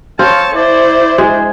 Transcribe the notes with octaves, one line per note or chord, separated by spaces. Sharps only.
C4 C#5 F5 A5
E4 C5 D5
G#3